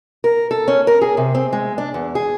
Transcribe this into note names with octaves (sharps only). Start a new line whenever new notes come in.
A#4
A4
C#4
A#4
G#4
C3
C4
G#3
D4
E2
G#4